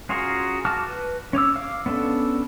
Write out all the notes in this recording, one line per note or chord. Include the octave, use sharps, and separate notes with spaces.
C#4 F4 F#4 G#4 A#4
F#4 A5 D6 F6
B4
C#4 C#5 D6 E6
F5 D6
B3 C#4 D4 A4